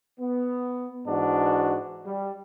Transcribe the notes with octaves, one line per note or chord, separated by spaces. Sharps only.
B3
G#2 E3 D4 F#4
G3